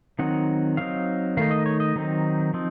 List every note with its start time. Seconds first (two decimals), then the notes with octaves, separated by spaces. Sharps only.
0.19 D#3 F#3 C4 D#4 F#5
0.77 F#3 C4 D#4 F5
1.37 D#3 A3 D#4 F5
1.51 D#5
1.66 C#5
1.80 D#5
1.96 D#3 F#3 C4 D#4
2.54 F3 C4 D#4